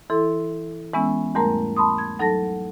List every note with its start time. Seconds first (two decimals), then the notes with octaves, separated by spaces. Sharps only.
0.10 E3 E4 A4 C6
0.94 E3 G#3 B3 C#4 E6
1.35 E2 G#2 G3 A3 A#4 A#5
1.76 A5 B5 C6 D#6
1.98 G#6
2.19 F#3 D#4 A4 F#5 A5 A#6